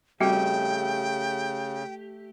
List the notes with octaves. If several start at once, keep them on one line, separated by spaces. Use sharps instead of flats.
C#3 G3 A3 C4 F#4 G4 G5